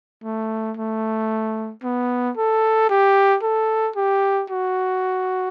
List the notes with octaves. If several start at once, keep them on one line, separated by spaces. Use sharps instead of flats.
A3
A3
B3
A4
G4
A4
G4
F#4